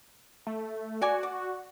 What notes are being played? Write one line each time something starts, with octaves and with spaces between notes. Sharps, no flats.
A3
F#4 C#5 D5 G#5
D5